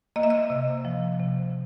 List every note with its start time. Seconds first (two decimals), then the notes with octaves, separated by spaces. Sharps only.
0.16 A#3 D#5
0.23 E5
0.30 D#5
0.50 C3
0.85 F3
1.20 C3